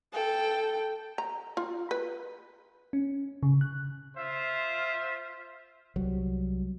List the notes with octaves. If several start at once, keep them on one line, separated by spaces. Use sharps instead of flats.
A4 G5
A#5
F4
B4
C#4
C#3
F#6
F4 C5 E5
C2 F#3 G3